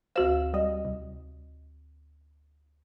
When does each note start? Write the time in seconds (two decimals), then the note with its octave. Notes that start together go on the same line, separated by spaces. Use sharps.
0.16 D2 F#4 C5 F5 E6
0.53 G3 D#5
0.85 C2